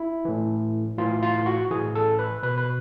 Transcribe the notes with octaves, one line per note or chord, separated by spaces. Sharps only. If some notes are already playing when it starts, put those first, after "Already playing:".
Already playing: E4
A2 E3
A2 E3 F4
F4
F#4
A2 E3 G#4
A4
B4
B2 B4
B4